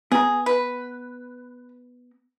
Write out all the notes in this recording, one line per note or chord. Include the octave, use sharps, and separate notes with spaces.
B3 G#4 A#5
B4